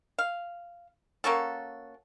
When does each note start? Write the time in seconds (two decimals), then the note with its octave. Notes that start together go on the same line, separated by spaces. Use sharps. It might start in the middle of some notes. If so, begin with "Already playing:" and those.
0.19 F5
1.24 A#3 C#4 F#4 A4